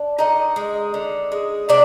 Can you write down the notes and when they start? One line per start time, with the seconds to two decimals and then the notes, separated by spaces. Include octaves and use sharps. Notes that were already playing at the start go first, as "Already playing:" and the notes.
Already playing: D4
0.19 D3 D#4 D#5
0.56 G#3
0.94 D3
1.32 G#3
1.69 C3 D4 D5